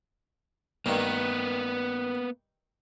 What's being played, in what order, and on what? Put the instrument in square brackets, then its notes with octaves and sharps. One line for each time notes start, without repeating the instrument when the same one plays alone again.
[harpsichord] G2 D#3 [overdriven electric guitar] A#3 B3